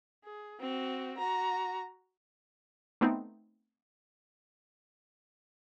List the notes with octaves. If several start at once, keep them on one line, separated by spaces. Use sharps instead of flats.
G#4
C4 F#4
F#4 A#5
A3 B3 C4 D#4